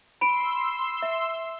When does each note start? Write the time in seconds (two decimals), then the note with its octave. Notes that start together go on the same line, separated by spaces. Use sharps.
0.21 B5 C6 E6 D7
1.02 E5